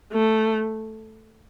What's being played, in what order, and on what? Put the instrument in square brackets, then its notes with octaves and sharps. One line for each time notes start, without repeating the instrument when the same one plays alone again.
[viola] A3